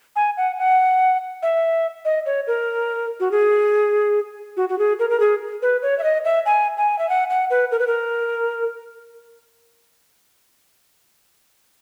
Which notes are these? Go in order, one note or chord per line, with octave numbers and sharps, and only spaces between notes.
G#5
F#5
F#5
E5
D#5
C#5
A#4
F#4
G#4
F#4
F#4
G#4
A#4
A#4
G#4
B4
C#5
E5
D#5
E5
G#5
G#5
E5
F#5
F#5
B4
A#4
B4
A#4